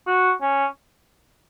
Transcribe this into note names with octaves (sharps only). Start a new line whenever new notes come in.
F#4
C#4